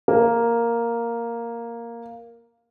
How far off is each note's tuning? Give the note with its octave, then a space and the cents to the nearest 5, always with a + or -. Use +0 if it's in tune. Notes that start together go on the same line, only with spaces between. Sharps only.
A#3 +0